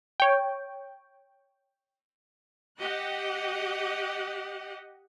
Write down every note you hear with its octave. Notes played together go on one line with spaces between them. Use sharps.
C#5 G5
G4 D#5 F#5